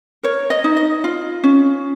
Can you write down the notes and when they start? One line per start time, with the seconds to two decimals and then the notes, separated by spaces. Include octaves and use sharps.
0.23 A#4 C#5
0.50 D#5
0.64 D#4
0.77 D#5
1.04 F4
1.44 C#4